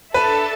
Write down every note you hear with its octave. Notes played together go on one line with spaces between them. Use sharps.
D4 A4 B4 E5 A5